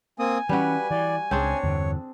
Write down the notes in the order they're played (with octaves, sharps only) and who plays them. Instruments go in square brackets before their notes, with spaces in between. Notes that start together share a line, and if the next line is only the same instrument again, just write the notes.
[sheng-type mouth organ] A#3 C4 D#6 [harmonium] G#5
[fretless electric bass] E3 C#4 [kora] G3 F#4 [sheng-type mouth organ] B4
[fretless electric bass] E3 [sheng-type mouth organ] D5
[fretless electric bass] C#2 [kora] C4 D4 G#4 [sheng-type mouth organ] C#5
[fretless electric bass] E2 G2 D3